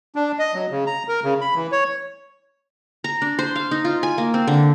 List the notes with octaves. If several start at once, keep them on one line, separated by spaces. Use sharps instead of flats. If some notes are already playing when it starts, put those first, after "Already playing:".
D4
D#5
F#3
C#3
A#5
A#4
C#3
B5
E3
C#5
A#5
D4
C5
F5
D#4
F4
G#5
A#3
C4
D3